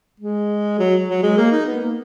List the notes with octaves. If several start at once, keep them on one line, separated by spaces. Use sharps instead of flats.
G#3
F#3
F#3
G#3
A#3
D#4
B3
A#3